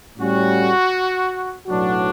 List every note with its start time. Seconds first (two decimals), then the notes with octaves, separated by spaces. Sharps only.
0.18 A2 G3 C#4 F#4
1.67 B1 A2 F#3 B3 D4 F#4